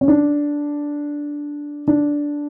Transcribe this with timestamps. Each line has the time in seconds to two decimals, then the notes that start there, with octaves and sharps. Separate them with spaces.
0.01 C#4
0.08 D4
1.88 D4